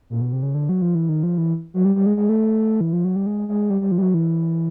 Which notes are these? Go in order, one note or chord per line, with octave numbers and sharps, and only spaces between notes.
A#2
B2
C3
C#3
D3
F#3
F3
E3
D#3
F3
E3
F#3
G3
G3
G#3
G#3
A3
E3
F3
F#3
G3
G#3
G#3
G3
G3
F3
G3
F#3
E3